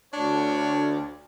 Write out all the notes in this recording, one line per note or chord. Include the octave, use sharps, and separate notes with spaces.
D2 D4 C#5